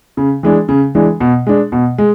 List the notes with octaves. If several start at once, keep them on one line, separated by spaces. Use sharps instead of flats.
C#3
E3 G#3 D4
C#3
E3 G#3 D4
B2
G#3 D4
B2
G#3